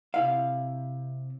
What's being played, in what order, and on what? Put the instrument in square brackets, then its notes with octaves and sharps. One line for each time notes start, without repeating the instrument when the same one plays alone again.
[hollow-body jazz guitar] C3 E4 F5